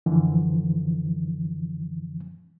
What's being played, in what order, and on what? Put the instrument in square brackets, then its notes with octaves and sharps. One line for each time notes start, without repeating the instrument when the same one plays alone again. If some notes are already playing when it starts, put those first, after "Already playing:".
[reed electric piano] F#2 D3 E3 F3